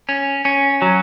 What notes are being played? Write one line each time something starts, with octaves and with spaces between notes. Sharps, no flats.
C#4
C#4
F#3